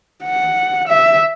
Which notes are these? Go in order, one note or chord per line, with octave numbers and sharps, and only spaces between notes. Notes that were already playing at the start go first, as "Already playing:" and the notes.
F#5
E5